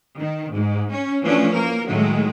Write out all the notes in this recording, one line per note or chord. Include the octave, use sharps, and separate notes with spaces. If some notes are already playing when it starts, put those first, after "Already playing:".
D#3
G#2
C#4
E3 F3 A3 C#4 D4
A#3 A#4
A2 D#3 F#3 G#3 A3